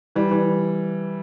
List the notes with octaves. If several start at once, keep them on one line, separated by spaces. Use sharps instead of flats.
E3 G3
E3